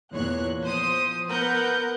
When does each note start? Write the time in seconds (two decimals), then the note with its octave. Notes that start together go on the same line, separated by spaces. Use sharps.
0.11 E2 A#2 C#5 F#6
0.63 F3 C5 D#6
1.29 B3 A#4 B4 F#5 G6